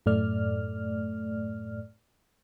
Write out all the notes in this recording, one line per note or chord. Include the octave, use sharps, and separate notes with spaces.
F#2 A2 A3 D5 F6